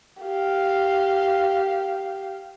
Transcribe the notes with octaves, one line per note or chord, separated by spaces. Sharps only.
G4 F5